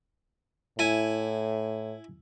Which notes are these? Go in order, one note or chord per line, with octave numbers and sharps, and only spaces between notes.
A2 E4 G#5